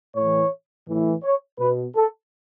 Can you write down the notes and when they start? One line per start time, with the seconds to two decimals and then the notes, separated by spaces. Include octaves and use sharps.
0.14 A2 E3 C#5
0.87 A2 E3
1.23 C#5
1.58 B2 B4
1.95 A4